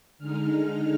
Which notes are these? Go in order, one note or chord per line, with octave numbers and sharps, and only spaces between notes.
D3 G#3 D#4 F6